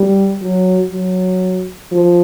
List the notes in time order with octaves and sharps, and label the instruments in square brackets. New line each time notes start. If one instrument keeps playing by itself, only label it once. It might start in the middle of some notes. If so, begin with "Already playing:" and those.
Already playing: [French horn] G3
F#3
F#3
F3